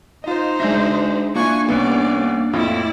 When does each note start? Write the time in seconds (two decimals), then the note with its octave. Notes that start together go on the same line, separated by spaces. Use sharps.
0.24 D#4 F4 C5 D#5
0.60 G#3 D4 F#4 D5 E5 G6 A#6
1.36 A#3 D4 E4 F4 G#5 C#6 F#6
1.69 C2 B3 C#4 D5
2.53 F2 A2 E4 F4 D5